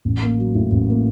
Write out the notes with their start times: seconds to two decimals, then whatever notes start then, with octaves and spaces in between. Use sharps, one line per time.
0.05 A1
0.22 A#3
0.38 F#3
0.55 A2
0.72 A1
0.89 A#3